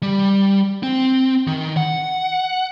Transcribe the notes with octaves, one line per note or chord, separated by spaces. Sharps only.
G3
C4
D#3
F#5